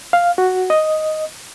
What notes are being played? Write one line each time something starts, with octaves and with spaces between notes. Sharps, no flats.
F5
F#4
D#5